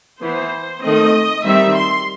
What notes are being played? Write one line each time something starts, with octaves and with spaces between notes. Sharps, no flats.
E3 B3 C5
D#3 A3 C4 D#5
D#3 G3 C4 E5
C6